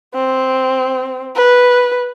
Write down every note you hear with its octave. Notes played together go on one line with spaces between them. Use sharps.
C4
B4